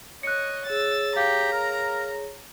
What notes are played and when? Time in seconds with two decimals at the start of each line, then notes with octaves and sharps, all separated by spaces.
0.23 C#5 D#5 F#6 C#7
0.66 G#4 C#5 E6 A6
1.16 G4 F5 A#5
1.53 A#4